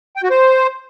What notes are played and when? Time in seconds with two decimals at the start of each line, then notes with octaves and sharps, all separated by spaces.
0.16 G5
0.23 F#4
0.30 C5